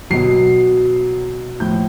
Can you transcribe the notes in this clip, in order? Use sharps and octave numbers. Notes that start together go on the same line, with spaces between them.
B2 F#3 C7
A2 F3 G6